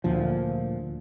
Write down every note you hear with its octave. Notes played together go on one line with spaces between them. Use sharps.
D2 A#2 F3